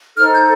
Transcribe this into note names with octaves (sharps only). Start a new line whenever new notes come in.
D#4 A4 C5 F6
G6